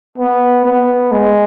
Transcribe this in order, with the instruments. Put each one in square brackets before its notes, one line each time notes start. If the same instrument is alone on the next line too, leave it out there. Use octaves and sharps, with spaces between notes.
[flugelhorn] B3
B3
G#3